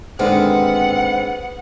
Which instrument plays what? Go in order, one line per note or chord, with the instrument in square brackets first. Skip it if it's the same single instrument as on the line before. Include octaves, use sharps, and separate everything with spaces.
[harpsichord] D#2 G#2 D3 [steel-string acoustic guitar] B3 [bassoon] C4 [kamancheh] F#5